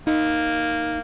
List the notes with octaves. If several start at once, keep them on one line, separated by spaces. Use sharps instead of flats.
A#3 D#4